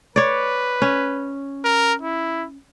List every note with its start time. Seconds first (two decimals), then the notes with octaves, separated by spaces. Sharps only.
0.16 B4 C#5 D5
0.82 C#4
1.64 A#4
2.02 E4